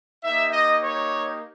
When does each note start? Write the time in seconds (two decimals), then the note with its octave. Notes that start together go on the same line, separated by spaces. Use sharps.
0.24 A#3 D#4 G4 E5
0.53 D#5
0.83 C#5